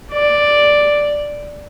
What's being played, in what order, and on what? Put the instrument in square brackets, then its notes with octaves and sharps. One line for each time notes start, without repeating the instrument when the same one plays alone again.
[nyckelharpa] D5